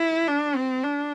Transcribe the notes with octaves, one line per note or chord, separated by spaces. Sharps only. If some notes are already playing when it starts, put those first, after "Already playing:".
Already playing: E4
D4
C4
D4